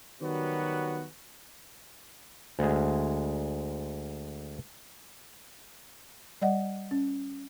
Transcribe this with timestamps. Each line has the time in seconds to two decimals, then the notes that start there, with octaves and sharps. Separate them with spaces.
0.22 D#3 F#3 G3 B3 F#4
2.59 D2 G#3
6.42 G3 D5 D#5 F#5
6.91 C#4